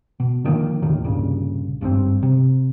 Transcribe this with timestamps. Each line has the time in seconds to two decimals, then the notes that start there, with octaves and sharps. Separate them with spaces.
0.20 B2
0.44 D3 D#3 F3 A#3
0.82 D#2 A2 D3 D#3
1.04 C2 G2 A#2 C#3
1.81 G#1 G2 D3 C4
2.23 C3